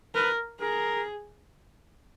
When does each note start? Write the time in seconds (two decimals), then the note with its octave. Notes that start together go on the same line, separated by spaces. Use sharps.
0.15 A#4 B4
0.61 G#4 A#4